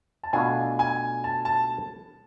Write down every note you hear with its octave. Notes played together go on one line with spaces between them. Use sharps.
A5
B2 A3 D4 F4 G#5
G#5
A5
A5